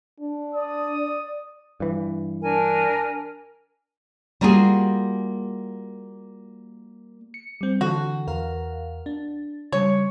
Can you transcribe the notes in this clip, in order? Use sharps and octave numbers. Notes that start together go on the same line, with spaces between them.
D4
D5 D#6
G2 E3
D4 A#4 G#5
G3 A#3 F4 F#4 G#4
C#7
G3 C4
D3 E3 F#4 A4
E2 A#4 F5
D4
C#3 G3 C#5